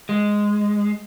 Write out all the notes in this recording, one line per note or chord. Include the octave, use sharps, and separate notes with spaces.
G#3